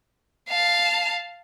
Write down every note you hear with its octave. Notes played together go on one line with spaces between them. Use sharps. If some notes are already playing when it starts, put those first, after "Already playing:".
F5 A5